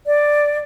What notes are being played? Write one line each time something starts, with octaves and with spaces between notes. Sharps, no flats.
D5